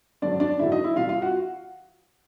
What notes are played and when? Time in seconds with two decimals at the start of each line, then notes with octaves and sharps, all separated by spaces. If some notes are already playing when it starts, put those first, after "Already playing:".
0.22 G#1 F#2 D3 F#3 D4 D5
0.40 D4 D5
0.59 G#1 F#2 D3 F#3 E4 E5
0.72 D#4 D#5
0.84 E4 E5
0.96 C2 C3 E3 F4 F5
1.09 F4 F5
1.22 F#4 F#5